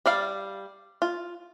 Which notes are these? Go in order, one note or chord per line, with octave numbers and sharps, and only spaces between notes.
G3 D5 F5
F4